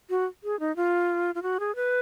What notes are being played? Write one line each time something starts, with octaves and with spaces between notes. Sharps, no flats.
F#4
G#4
D#4
F4
F4
F#4
G#4
B4